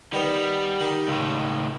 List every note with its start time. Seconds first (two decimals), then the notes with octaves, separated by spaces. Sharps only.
0.13 D#3 G3 B3
0.80 D#3 D#4
1.08 C#2 A2